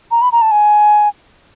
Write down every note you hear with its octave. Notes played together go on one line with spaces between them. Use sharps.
A#5
B5
A#5
A5
G#5